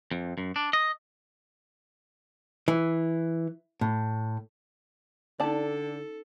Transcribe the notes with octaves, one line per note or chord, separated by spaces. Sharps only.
F2
F#2
D4
D#5
E3
A2
D3 C#4 D#4 A4 D5 A5